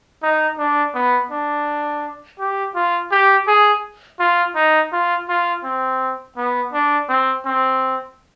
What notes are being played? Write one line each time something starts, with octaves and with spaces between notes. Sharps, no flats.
D#4
D4
B3
D4
G4
F4
G4
G#4
F4
D#4
F4
F4
C4
B3
D4
C4
C4